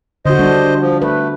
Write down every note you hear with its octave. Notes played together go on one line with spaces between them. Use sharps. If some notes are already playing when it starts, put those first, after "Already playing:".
D3 F#4 C5 D#5
G3 D4
F3
A3 B4